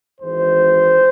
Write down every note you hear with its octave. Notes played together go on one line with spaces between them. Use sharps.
G#1 G#2 E3 G#3 C5